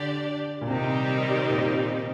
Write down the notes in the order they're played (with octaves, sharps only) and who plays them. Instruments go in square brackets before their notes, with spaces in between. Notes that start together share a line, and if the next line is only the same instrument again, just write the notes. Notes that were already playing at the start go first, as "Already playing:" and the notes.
Already playing: [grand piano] D3 [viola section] D4 G4 D5
[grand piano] A#2
[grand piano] C3 [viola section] D#3 G3 C4 D#4 G4
[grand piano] A#2
C3